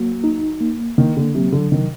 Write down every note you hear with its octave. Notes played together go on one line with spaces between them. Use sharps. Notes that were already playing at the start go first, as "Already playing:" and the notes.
Already playing: F#3 A#3
D#4
A#3
D#3 A#3
D3
C3 F#3
D3
C3 D#3